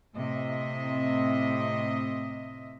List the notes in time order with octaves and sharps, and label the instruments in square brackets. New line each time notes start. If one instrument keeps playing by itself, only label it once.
[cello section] A2 C3 D#5 E5